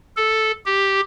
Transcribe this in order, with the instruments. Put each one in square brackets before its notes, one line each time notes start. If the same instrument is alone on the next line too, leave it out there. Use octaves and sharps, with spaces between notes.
[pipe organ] A4
G4